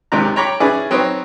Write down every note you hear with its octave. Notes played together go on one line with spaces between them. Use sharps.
C#2 C3 D#3 D5 A#5
C#5 G5 A#5 B5 C#6 D6
C#4 E4 G#4 B4 D5
F#3 C4 D#4 B4 C#5 D#5